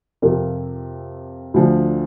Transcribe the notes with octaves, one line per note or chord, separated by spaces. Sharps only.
F2 C3 F3 A#4
D2 D3 F3